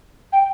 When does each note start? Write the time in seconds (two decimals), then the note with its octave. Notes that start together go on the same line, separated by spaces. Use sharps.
0.33 G5